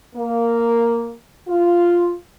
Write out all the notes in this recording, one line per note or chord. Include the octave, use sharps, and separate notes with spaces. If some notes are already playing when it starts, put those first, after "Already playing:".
A#3
F4